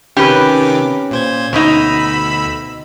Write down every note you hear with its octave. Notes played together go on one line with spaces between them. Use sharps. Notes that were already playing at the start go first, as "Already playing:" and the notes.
C3 D#3 C#4 G4 B4 D6
A#2 C5 G#6
D2 B2 D#4 B5 E6